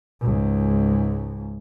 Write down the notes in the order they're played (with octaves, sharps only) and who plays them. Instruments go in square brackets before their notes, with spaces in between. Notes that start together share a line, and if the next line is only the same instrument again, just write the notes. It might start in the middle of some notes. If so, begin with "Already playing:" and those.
[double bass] C#2 G#2